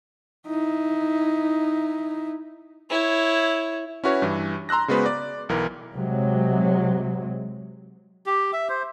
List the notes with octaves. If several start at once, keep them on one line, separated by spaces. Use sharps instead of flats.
D#4 E4
E4 C#5
C#4 E4 F#4 B4 C#5
G2 E3
A#5 C6 E6 F#6 A#6
C#3 G#3 B3 F#4 B4 C5
D5
B1 E3 A#4
C3 F#3 G#3
G4
E5
C5